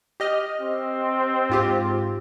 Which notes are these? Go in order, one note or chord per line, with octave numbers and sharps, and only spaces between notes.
G4 D#5 F6
C4
G#2 F4 G4